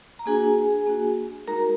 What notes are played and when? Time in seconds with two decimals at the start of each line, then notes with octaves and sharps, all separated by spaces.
0.19 A#5
0.26 A#3 D4 F#4 G#4 G#5
0.86 A#3 D4 F#4
1.47 G#3 D#4 F#4 A#4 A#5